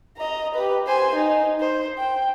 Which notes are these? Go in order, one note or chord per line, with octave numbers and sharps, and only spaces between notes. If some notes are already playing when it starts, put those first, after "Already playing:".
D#5 A#5
G4 B4
C5 G#5
D#4
C5
G5